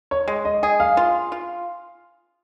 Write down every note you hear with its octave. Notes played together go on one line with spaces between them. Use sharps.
C#5
G#3
D#5
G#4 D#5
F5
F4
F4